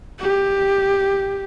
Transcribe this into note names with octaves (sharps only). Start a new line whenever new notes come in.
G4